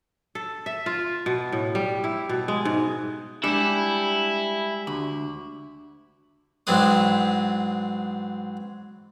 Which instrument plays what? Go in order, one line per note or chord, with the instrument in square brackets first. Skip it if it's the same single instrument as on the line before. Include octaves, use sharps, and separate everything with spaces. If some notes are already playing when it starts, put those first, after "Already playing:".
[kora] A4
E5
F4
B2
A2
G3
E4
B2
G#3
G#2
[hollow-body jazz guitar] G3 D4 [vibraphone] G#3 G4 [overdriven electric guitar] E4
[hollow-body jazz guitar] D2 [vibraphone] D4
[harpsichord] G#2 E3 F#3 C4 D4 D#6